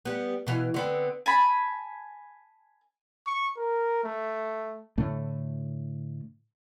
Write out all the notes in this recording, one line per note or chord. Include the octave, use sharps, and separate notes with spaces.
G3 B3
B2 E3 F5
D3 B3 C4
G#5 A5 B5
C#6
A#4
A3
A2 D3 A3